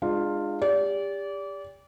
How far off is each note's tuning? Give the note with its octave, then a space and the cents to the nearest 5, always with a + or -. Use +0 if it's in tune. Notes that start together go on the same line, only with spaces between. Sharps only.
G#3 +0 D4 +40 F4 +0
G4 +35 D5 -30